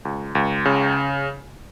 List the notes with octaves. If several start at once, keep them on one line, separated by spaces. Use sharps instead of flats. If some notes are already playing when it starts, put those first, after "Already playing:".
C#2
C#2
C#3